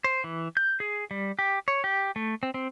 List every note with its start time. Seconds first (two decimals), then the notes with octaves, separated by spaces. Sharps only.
0.04 C5
0.24 E3
0.57 G6
0.80 G#4
1.11 G3
1.39 G4
1.68 C#5
1.84 G4
2.16 A3
2.43 C4
2.54 C4